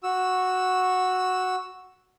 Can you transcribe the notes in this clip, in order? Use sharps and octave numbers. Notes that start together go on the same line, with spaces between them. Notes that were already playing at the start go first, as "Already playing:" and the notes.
F#4 E6